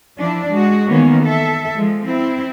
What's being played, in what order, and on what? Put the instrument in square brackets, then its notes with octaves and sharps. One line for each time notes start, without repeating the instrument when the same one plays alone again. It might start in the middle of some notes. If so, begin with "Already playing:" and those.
[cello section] F3 D4 E4
G#3 F#4
D#3 E3 A#3 B3 C#4
A4 E5
F3 G#3
C4 E4